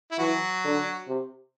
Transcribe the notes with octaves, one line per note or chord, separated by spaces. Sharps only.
E4
E3 F#3 F#4
D3
C3